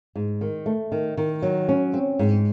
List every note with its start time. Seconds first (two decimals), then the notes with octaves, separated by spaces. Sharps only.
0.16 G#2
0.41 D#3
0.66 A3
0.92 D#3
1.17 D#3
1.42 F#3
1.69 C#4
1.94 C4
2.19 G#2